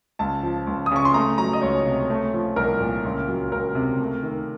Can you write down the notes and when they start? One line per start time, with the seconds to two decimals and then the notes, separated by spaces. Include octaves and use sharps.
0.19 C#2 A5
0.43 F3
0.67 C#2
0.86 D#6
0.91 C#3 C#6
1.05 C6
1.14 A3 A#5
1.38 F#3 A#5
1.53 D#5
1.61 C#2 C#5
1.86 C3
2.10 A3
2.34 F3
2.56 C2 A#4
2.80 A#2
3.05 C#2
3.28 F#3
3.52 C#2 A#4
3.75 C3
4.00 A3
4.23 D#3